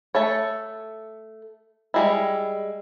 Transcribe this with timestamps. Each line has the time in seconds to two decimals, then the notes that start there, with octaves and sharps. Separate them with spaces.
0.15 A3 A4 C#5
1.94 G3 G#3 E4